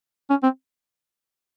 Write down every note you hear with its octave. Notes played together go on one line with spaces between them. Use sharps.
C#4
C4